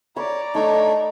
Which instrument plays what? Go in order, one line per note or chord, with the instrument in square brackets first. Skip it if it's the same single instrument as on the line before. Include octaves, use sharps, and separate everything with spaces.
[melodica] C#5 [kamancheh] D5 A#5 [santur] B5
[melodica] A3 D4 C#5 [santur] D#4